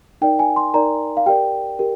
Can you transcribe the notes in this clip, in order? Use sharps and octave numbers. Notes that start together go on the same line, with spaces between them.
D#4 A#4 D5 G5
G#5
C6
D#4 A#4 D5 A#5
F5
G4 A#4 D5 G5
G4 A#4